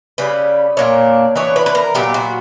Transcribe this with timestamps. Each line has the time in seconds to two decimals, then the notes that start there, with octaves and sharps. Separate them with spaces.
0.18 C#3 G3 C#4 B4
0.77 A#2 A#3 D4 C#5
1.35 E3 B3 D4 C#5
1.56 B4
1.66 B4
1.75 A#4
1.94 A#2 F#3 B3 G4
2.14 F#4